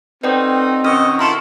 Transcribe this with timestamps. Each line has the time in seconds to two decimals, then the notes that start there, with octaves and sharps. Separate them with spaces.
0.24 F#3 A3 C4 D#4 B4 D5 G5
0.84 B2 D#3 C#4 D#5 C#6 E6 F6
1.19 E4 F4 A4 A#5 C6 C#6